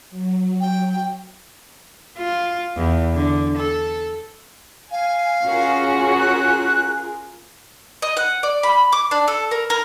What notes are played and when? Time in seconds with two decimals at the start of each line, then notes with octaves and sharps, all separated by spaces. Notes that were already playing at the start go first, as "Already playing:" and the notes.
0.11 F#3
0.61 G5
2.18 F4
2.77 E2
3.15 D3
3.58 A4
4.91 F5 G#5
5.44 C#4 F4 F#4 G#4 A#4
6.19 F#6
8.02 D#5
8.17 F#5
8.43 D5
8.63 B5
8.92 D6
9.11 D4
9.28 A4
9.51 A#4
9.70 A#4